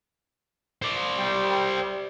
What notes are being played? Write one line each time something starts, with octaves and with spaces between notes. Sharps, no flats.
C5 D5
G3 G5